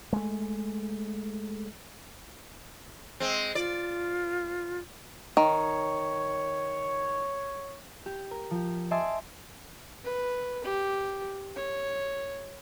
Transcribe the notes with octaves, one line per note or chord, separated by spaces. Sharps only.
G#3 A3
G#3 C4
F4 D5
D#3 C#5
G4
A#4
F3 G4
D#5 E5 G#5 A5 C6 D6
B4
G4
C#5